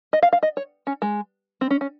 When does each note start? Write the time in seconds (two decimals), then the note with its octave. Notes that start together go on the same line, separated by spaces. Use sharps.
0.13 D#5
0.22 F5
0.33 F5
0.43 D#5
0.57 C#5
0.87 C#4
1.02 G#3
1.61 C4
1.70 C#4
1.81 C#4